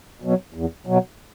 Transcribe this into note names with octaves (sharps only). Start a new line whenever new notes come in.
B2 F#3
E2
B2 F#3